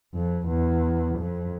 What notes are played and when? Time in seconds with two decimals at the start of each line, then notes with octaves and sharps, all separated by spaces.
0.14 F2
0.48 E2
1.18 F2